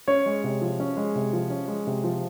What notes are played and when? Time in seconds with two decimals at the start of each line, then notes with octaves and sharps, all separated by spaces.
0.08 C#4 C#5
0.26 G#3
0.44 C3
0.61 F3
0.80 C#4
0.97 G#3
1.15 C3
1.33 F3
1.50 C#4
1.68 G#3
1.87 C3
2.04 F3